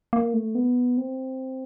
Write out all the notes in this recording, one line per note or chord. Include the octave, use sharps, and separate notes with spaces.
A#3
A3
B3
C4